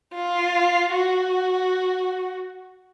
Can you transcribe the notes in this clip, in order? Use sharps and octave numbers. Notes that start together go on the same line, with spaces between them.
F4
F#4